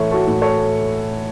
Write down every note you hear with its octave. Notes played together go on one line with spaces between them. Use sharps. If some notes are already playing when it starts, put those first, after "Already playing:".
Already playing: A2 E3 A3 C#5 E5
F#4 A4
A2
A4 C#5